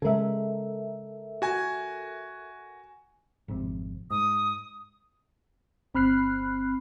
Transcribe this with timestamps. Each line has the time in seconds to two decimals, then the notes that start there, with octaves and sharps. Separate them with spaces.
0.02 C#3 G#3 A4 A#4 E5
1.42 F#4 G#5
3.48 G#1 F2 C3
4.11 G#2 D#6
5.94 G1 C4 B5 F6 F#6 C7